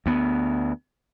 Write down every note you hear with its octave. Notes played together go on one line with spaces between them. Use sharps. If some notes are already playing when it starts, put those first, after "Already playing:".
D2 B3